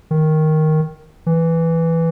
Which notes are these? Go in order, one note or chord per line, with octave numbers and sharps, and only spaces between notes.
D#3
E3